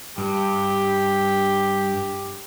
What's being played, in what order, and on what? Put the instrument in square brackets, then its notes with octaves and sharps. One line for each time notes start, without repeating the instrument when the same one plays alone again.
[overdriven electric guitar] G2 [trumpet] G4